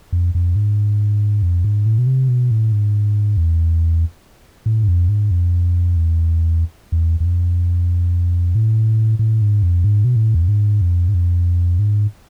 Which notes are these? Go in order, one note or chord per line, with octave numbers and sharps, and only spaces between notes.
F2
F2
G#2
F2
G#2
A2
B2
C3
B2
A2
G#2
E2
A2
G#2
F2
G#2
F2
E2
E2
E2
F2
A2
A2
G#2
F2
G#2
B2
A2
E2
F2
G#2
F2
G#2
F2
G#2